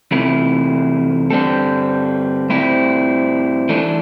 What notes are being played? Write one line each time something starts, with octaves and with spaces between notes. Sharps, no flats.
E2 C3 A3 E4
G2 D3 G3 C4 A4
A2 G3 C4 E4
E3 A3 D4 A4